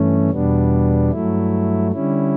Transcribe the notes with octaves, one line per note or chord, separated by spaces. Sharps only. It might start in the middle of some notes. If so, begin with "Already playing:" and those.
Already playing: G2 E3 A3 C#4
E2 B2 G3 B3 D4
G2 F#3 A3 E4
D3 G3 C#4 E4